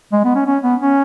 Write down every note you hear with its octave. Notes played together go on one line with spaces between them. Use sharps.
G#3
B3
C#4
C#4
B3
C#4